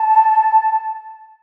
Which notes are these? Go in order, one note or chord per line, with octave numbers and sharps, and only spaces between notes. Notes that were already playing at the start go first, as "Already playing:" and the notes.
Already playing: A5